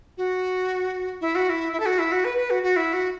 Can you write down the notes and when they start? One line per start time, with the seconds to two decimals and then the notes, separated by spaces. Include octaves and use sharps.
0.18 F#4
1.21 E4
1.35 F#4
1.49 E4
1.73 E4
1.80 A4
1.86 F#4
1.99 E4
2.12 F#4
2.25 B4
2.38 B4
2.50 F#4
2.63 F#4
2.76 E4
2.93 F#4